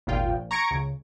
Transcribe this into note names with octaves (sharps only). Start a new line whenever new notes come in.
G#1 D#2 A#2 F4 G5
A#1
A#5 C#6 G#6 A#6 C#7 D7
C#2